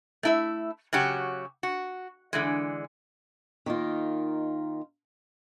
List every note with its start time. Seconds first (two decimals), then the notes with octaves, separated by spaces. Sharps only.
0.23 A3 E4 E5
0.93 C#3 F#3 F#4 G4
1.63 F#4
2.33 D3 E3 G#3
3.66 D#3 A#3 D#4 F4